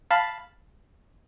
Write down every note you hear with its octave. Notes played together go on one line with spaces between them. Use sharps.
F5 A5 B5